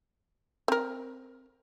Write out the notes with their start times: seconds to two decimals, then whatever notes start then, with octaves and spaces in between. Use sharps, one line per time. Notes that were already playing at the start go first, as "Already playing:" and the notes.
0.68 C4 A#4